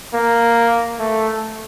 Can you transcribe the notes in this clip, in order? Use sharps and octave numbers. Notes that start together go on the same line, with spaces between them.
A#3
A3